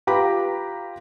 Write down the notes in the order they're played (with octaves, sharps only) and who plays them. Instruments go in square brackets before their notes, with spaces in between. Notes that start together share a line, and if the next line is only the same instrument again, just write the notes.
[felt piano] F4 G4 B4 A#5 B5 D6